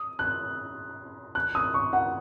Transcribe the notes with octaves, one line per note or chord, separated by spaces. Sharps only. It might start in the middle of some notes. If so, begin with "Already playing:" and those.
Already playing: D#6
F#6
F#6
D#6
C#6
F#5